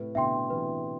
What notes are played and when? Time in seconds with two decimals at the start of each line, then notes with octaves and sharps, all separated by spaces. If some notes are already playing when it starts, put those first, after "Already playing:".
Already playing: A2 C3 B4
0.15 B2 D3 E5 G5 C6
0.50 C3 E3 B4